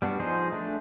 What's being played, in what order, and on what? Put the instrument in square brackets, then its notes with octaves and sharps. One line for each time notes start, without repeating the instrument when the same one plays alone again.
[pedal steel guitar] G3 B3 D4 F#4
F3 D#4 G#4 C5
A3 D4